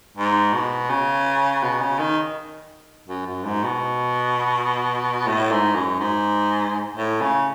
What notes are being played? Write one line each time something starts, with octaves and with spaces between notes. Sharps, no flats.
G#2
B2
C#3
B2
C#3
D#3
F#2
F#2
G#2
B2
A2
G#2
F#2
G#2
A2
C#3